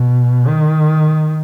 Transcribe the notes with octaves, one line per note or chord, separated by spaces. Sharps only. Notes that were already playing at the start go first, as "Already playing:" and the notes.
Already playing: B2
D#3